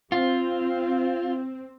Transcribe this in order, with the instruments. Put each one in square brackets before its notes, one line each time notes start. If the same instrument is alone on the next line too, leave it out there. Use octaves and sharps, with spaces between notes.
[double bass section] C4 [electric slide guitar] F4